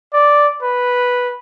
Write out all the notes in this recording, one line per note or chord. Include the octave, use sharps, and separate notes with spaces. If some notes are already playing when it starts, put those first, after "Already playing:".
D5
B4